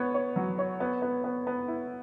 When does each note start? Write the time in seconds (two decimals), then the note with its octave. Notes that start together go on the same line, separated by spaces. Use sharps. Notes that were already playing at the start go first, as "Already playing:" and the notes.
Already playing: B3 C#5
0.14 C#5
0.36 F#3
0.58 C#5
0.80 B3
1.02 B3
1.24 B3
1.47 B3
1.68 E4